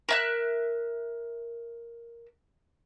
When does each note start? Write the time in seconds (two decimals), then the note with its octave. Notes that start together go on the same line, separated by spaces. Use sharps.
0.09 A#4 E5 F#6